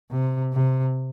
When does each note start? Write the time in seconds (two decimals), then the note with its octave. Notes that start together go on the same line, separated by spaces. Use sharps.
0.11 C3
0.53 C3